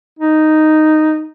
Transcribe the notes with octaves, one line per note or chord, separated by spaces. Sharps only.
D#4